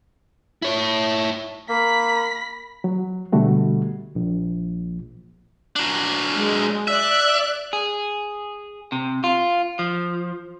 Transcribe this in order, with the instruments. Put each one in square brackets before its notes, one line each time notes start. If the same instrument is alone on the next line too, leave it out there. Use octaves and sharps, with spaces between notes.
[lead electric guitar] E4 C#5
[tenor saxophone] A#3 [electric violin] B5 B6
[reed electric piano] F#3
B2 D3 G3 A3 F#4
[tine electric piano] A#1
[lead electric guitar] F#3 D4
[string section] G#3
[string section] D5 F#6 [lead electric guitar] E5
[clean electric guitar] G#4
C3
F4
F3